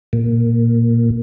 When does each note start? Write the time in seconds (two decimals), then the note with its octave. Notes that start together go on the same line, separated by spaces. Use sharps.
0.13 A#2